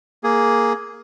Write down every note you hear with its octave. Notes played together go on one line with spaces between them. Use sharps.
A#3 G#4